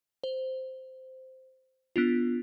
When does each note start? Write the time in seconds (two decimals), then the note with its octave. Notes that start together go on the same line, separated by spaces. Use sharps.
0.24 C5
1.96 B3 D4 F4